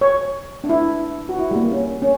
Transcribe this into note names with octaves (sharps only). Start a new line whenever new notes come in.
C#5
D4
E4
F#4
E4
G3
A#3
C#4
C#4